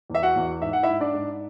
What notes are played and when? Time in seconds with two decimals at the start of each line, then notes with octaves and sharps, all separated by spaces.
0.10 E2 E5
0.22 F#4 F#5
0.36 E2
0.61 G#2 E5
0.73 F#5
0.83 E4 E5
0.89 G#2
1.00 D4 D5
1.14 G#2